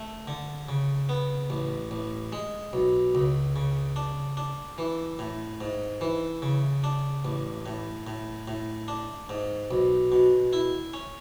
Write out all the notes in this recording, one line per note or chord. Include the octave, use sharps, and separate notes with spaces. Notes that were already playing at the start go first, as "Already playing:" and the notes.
Already playing: A3
D3
C#3
B3
A1
A1
G#3
B1
C#2
C#3
D4
D4
E3
A2
G#2
E3
C#3
D4
A1
A2
A2
A2
D4
G#2
B1
B2
E4
C#4